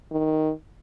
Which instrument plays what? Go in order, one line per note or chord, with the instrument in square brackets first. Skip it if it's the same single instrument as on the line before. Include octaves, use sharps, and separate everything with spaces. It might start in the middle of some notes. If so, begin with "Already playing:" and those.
[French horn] D#3